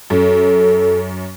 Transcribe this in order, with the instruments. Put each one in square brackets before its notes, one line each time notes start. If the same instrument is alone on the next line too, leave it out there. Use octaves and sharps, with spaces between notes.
[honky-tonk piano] F#2 [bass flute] A4